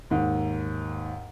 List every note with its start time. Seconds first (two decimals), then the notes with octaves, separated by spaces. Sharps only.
0.10 D#2 G#2